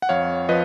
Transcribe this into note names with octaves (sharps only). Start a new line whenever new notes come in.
F#5
F2 C#5 F5
F3 B4 D#5